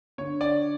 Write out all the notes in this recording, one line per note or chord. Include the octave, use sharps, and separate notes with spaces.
D3 C#5
D5